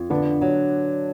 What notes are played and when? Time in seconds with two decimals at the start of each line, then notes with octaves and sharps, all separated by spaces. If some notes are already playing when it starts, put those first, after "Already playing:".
Already playing: F2
0.10 D3 B3 D4
0.42 F#3